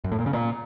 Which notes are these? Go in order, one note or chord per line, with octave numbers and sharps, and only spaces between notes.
F#2
A2
A#2
C#3
A#2